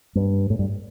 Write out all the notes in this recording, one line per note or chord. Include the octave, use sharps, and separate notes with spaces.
G2
A2
G2